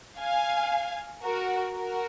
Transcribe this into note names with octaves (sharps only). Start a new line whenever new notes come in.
F5 G#5
F#4 A#4
F#4 A#4